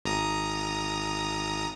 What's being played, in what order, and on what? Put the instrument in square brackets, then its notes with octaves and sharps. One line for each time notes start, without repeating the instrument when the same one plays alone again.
[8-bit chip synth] G#1 A#5 D#6